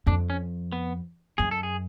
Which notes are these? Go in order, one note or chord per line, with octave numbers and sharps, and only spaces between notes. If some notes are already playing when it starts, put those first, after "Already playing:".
F2 D4
C#4
B3
F#2 G#4
A4
G#4